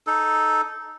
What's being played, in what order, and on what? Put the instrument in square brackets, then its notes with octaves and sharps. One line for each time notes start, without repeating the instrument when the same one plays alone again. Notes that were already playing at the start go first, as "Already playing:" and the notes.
[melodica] D#4 A4